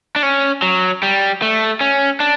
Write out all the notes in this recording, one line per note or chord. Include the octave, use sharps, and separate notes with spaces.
D4
C#4
F#3
G3
A3
C#4
D4